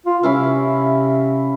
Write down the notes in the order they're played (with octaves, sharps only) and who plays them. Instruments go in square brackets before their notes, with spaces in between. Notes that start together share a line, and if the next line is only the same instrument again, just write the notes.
[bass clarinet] F4
[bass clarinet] C3 [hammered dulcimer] C#4 E4 F5